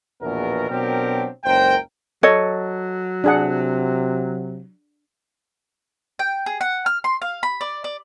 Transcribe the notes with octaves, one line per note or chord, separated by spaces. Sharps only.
A#1 E2 B2 B3 A#4
B2 F#3 C4 D4 G4 A#4
F#1 C#2 A#4 C5 G5
F#3 A4 C#5 D#5
C3 D4 G#4 F#5
G5
G#4
F#5
F6
C6
F5
B5
D5
D5